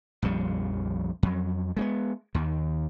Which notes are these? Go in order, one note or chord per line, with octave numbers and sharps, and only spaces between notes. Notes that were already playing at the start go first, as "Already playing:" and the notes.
A#1 F2 C#3 G3
F2 F#3
G#3 A#3 B3
D#2 D#3